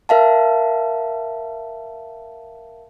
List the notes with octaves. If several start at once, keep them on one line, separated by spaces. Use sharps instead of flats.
A#4 E5 F5 A5